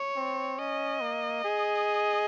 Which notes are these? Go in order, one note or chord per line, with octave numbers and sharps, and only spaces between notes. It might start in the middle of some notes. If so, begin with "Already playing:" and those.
Already playing: C#5
C4
C#4 D#5
A#3
G#4